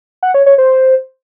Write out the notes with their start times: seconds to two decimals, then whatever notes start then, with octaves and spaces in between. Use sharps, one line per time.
0.23 F#5
0.34 C#5
0.46 C#5
0.58 C5